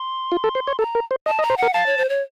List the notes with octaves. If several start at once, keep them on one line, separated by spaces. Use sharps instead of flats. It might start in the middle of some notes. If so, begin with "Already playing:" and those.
Already playing: C6
F4
A4
C5
C#5
A4 A#5
A#4
C5
D#5 A5
D#5
A#5
C5
A#4 F#5
F5 A5
C#5
C5
C#5